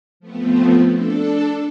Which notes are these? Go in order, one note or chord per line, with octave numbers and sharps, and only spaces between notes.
F3 A3 B3 C4
D4 A4